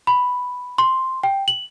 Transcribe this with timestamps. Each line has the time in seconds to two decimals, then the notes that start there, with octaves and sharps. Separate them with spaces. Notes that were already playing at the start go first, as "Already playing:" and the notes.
0.07 B5
0.78 C6
1.24 G5
1.48 F#7